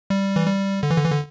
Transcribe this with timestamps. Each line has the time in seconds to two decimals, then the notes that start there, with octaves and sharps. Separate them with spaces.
0.10 G3
0.36 E3
0.47 G3
0.83 D3
0.90 E3
0.97 D3
1.04 E3
1.12 D3